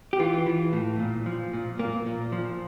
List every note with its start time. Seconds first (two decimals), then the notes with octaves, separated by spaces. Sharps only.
0.13 G4
0.19 E3 F4
0.47 E3
0.73 A2
0.99 A#2
1.26 F3
1.53 A#2
1.79 A#2 A#3
2.06 A#2
2.32 F3